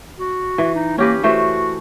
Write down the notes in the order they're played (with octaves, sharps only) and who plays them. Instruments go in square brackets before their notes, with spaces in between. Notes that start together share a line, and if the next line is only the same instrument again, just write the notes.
[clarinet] F#4
[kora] E3
[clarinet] D#4
[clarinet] A#3 [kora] C#4 G4 B4
[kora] E3 A3 C5 [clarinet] F#4